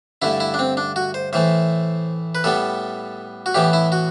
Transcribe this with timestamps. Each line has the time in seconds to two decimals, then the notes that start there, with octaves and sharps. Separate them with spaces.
0.22 G2 D3 A3 E4
0.40 E4
0.54 D4
0.59 C4
0.77 D4
0.96 F#4
1.14 C5
1.33 A2 E3 A3 C5
2.35 B4
2.44 A2 G3 B3 A4
3.46 F#4
3.54 A2 E3 B3 G4
3.73 E4
3.92 F#4